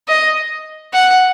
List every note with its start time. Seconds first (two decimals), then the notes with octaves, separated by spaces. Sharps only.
0.08 D#5
0.93 F#5